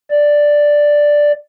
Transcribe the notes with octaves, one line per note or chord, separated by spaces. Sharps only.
D5